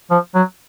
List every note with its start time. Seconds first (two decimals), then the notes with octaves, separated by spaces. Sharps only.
0.11 F3
0.35 F#3